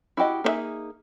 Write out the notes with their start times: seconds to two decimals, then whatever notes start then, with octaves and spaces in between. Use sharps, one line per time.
0.17 E4 F#4 G4 D#5
0.44 A#3 D4 D#4 G#4 E5